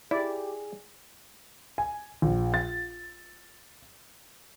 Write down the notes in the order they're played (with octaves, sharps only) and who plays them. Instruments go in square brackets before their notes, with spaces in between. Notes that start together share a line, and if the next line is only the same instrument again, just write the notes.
[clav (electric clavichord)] E4 [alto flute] G4 [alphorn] G#4 [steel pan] D5
[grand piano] G#5
A#1
A6